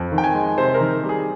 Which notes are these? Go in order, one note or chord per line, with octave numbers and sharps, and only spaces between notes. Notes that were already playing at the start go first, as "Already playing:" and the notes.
Already playing: F2
D#3
G5
G#5
G#3
C3 C5
A#4
D#3
G3
G#4